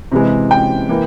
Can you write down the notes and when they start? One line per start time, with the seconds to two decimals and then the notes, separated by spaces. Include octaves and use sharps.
0.12 C3 E3 G#3
0.51 G5
0.89 E3 A#3